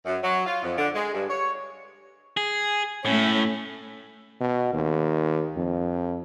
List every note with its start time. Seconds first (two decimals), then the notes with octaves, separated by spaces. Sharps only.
0.06 F#2
0.23 F#3
0.46 F4
0.63 F2
0.78 D3
0.95 G#3
1.14 G2
1.30 C#5
2.37 G#4
3.05 A2 A3 C#4
4.40 B2
4.73 D#2
5.57 F2